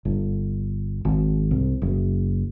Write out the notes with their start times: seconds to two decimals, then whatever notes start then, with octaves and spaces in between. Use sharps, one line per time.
0.05 G1
1.05 G#1
1.51 C2
1.82 F#1